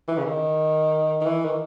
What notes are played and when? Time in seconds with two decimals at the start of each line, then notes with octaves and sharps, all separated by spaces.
0.08 E3
0.18 C#3
0.25 D#3
1.21 D#3
1.26 E3
1.45 D#3